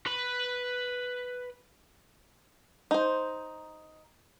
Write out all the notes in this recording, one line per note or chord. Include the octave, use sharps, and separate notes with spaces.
B4 B5
D#4 C5